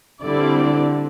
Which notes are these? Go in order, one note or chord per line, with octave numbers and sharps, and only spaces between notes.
D3 G3 C4 E4 A4 D5